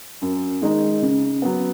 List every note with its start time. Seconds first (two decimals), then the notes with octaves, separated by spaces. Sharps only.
0.22 F#2
0.62 D#3 G#3 D#4
1.02 C#3
1.42 F#3 B3